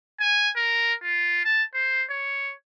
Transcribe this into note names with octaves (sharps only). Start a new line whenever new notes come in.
G#5
A#4
F4
A5
C5
C#5